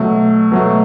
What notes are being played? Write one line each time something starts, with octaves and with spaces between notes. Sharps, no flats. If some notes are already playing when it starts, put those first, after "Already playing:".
Already playing: B2 F#3 A3
B2 F#3 A3